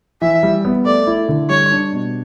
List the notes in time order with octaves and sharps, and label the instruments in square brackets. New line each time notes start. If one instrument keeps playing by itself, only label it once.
[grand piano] E3 [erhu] E5
[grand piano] G3
B3
[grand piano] A3 [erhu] D5
[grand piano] E4
D3
[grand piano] G3 [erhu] C#5
[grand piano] D4
B2